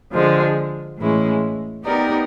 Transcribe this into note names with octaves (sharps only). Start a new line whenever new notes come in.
D3 F3 G#3
A2 E3 G#3 C#4 E4
B3 D#4 G4 A#4 D5